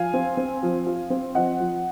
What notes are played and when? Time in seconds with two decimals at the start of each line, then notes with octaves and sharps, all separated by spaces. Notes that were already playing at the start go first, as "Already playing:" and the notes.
Already playing: F3 F5 G#5
0.14 C4
0.37 C4
0.63 F3
0.87 F4
1.10 C4
1.35 F3 D#5 F#5
1.60 F3